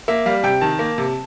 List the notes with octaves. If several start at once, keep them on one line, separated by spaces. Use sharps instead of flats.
A#3 E5
G3 F5
C3 G5
D#3 A5
A#3
C3